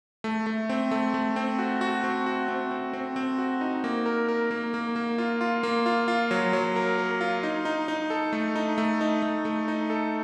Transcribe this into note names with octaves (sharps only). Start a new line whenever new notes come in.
A3
A3
C4
A3
A3
C4
F#4
F#4
C4
F#4
C4
C4
C4
C4
F#4
D#4
A#3
A#4
A#4
A#3
A#3
A#3
F4
F4
A#3
F4
F4
F#3
F#3
A#4
A#4
F4
D#4
D#4
D#4
A4
A3
D#4
A3
D#4
A3
A3
D#4
A4